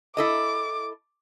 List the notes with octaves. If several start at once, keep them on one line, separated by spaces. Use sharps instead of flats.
E4 A4 D#5 D6